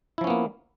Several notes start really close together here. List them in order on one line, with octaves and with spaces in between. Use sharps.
E4 F3 C#4 B3 A#3